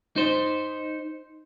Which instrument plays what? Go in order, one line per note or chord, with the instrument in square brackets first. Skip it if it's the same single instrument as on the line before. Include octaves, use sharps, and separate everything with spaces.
[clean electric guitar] D#4 C5